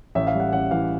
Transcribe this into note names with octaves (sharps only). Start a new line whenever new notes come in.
A1 E5
F5
G3
F#5
A1 F#5
E3 F5